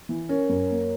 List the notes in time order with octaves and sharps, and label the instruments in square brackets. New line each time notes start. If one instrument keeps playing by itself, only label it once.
[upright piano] E3
[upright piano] C#4 [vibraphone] A#4 C#5
[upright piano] F#2
A#3